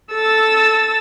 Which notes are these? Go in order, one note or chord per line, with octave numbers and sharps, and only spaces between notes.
A4 E6 A6